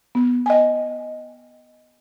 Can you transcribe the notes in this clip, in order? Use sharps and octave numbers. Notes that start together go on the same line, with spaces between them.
B3
D#5 G5 G#5